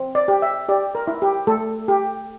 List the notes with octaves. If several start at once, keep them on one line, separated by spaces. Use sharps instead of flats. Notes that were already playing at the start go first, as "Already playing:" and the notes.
Already playing: C4
D5
G4
E5
G4 D5
A#4
E4
G4
A3 A4
G4